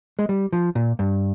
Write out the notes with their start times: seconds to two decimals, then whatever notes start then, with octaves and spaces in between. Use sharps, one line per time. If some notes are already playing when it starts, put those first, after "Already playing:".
0.19 G#3
0.29 G3
0.53 F3
0.75 A#2
0.99 G2